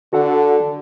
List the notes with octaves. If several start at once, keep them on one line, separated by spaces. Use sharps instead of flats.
D3 F#4 A4 F#5